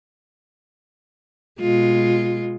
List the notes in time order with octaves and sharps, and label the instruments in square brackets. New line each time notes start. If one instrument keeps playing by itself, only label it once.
[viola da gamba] B2 G#3 F4